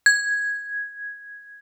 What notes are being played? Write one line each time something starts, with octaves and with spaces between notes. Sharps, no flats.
G#6